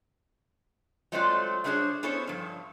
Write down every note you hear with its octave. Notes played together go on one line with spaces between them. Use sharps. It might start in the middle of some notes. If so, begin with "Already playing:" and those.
F#3 G#3 A3 C4 F4 D5
G3 A3 D4 G#4 C5 C#5
B3 C#4 E4 A4 C5 C#5
G2 F3